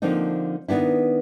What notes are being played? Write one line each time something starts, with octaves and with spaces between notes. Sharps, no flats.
D3 F3 A#3 C4 D4 D#4
D#3 B3 D4 E4